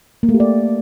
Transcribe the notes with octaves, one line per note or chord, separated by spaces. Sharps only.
A#3
A3
G4
D5